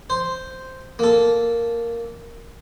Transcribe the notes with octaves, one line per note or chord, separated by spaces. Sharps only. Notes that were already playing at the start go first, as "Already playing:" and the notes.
C5
A#3 A4